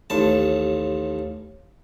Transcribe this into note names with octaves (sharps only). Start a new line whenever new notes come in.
A1 D#2 A5